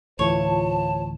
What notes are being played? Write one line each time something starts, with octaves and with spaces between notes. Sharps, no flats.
D2 A2 E3 F4 C5 C#5 A5